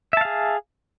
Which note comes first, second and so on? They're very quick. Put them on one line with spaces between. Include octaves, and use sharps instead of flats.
E5 A5 F5 G#4